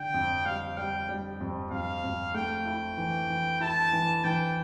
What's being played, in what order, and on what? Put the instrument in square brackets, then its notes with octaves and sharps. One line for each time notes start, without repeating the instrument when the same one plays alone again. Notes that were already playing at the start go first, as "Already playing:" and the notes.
Already playing: [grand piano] D3 [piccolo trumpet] G5
[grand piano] F2
[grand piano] G3 [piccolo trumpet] F5
[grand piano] G3 [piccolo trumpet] G5
[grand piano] G3
F2
[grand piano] F2 [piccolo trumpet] F5
[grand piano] F2
[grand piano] A3 [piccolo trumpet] G5
[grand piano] E4
E3
E3
[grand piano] E4 [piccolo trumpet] A5
[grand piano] E3
[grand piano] E3 [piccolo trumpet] G5